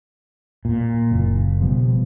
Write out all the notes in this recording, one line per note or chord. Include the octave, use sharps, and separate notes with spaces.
A#2
F#1
B2 F3 G3